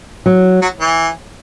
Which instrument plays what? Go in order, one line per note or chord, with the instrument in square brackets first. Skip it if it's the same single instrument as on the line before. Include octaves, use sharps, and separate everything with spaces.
[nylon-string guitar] F#3
[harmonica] F#3
E3